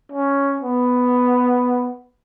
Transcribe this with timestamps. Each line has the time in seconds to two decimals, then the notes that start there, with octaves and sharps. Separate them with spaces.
0.12 C#4
0.61 B3